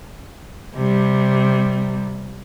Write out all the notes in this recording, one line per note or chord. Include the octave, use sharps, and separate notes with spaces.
C3 G3